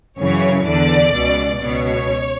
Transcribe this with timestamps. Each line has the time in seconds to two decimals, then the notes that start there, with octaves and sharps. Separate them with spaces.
0.18 F#2 C#3 E3 C#5
0.66 E2 D3 D5
1.14 C#2 B2
1.62 C#2 B2 C#5